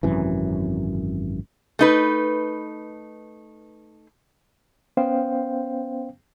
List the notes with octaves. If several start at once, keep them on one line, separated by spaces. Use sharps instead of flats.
G#1 F#2 C3 E3
A3 D#4 B4
B3 C#4 C5 F5 G5